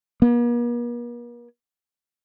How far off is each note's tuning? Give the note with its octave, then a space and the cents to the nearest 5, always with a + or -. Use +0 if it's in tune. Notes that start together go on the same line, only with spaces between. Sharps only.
A#3 +45